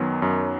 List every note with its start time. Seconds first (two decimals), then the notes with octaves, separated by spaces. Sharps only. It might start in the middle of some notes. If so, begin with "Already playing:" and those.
Already playing: F#2 D#3 F#3 B3
0.22 F#2